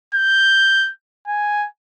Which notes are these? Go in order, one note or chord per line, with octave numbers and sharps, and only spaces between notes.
G6
G#5